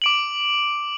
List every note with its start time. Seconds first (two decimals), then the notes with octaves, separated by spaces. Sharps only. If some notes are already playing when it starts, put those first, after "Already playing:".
0.02 D6 D7 F#7